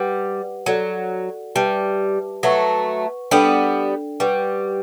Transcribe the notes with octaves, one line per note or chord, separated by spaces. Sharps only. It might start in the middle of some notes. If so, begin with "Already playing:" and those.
Already playing: G3 G4 B4 F#5
F#3 F#4 A4 D5 F#5
G3 G4 B4 E5 A5
F#3 A3 B4 F#5 C#6
G3 B3 D4 A4 D5 G5
G3 B4 F#5 C#6